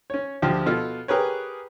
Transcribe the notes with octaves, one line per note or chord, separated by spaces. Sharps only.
C#4 C#5
D2 F3 F4 G4
B2 F4 A4
G4 G#4 A#4 B4 C#5